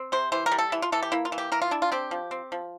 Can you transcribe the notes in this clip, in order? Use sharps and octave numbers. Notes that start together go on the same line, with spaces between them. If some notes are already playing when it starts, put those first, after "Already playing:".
Already playing: C4
C3 C5
E3 C5
A#4
G3
A4
E3 E4
F4
E3 A4
G4
A#3 E4
F4
E3
G4
E3 A#4
F4
D4 E4
F4
C4 G4
F3
C4
F3